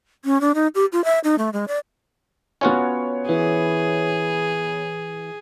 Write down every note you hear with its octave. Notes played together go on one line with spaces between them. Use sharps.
C#4
D4
D#4
G4
F4
E5
D#4
A3
G#3
D5
B3 C#4 F4 F#4 C#5
E3 G#4